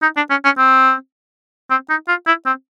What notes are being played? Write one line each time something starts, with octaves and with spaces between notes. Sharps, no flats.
D#4
D4
C#4
C#4
C4
C4
D#4
F4
E4
C4